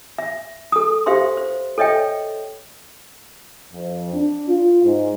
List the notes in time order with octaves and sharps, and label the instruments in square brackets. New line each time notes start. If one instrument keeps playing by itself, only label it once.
[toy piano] E5
A4 D#6
G4 C5 E5 F5 C6
C5
A4 C#5 D#5 E5 G5
[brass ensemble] F2
D4
F4
G#2